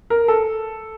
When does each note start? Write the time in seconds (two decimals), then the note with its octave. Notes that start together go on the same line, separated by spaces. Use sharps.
0.10 A#4
0.28 A4